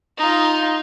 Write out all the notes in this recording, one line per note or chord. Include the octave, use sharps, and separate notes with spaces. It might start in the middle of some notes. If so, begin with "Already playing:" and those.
D#4 F4